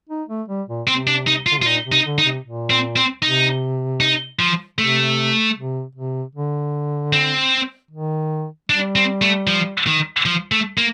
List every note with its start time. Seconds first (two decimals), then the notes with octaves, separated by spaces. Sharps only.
0.09 D#4
0.29 A3
0.48 G3
0.69 A#2
0.87 C3 C4
1.07 D4
1.27 D#4
1.46 F4
1.51 D3
1.58 C3
1.62 F4
1.66 A#2 D#4
1.85 C3
1.92 D#4
2.05 D3
2.18 D#4
2.25 C3
2.44 A#2
2.70 C4
2.96 C4
3.22 C3 D#4
4.00 D#4
4.39 F3
4.78 C3 A3
5.56 C3
5.96 C3
6.35 D3
7.13 C4
7.91 D#3
8.69 G3 D4
8.96 C4
9.22 A3
9.47 F3
9.87 D#3
10.26 F3
10.52 A3
10.78 A#3